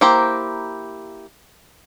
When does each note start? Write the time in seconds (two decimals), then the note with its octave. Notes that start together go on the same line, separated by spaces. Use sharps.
0.01 A#3 E4 G4 C5 A#5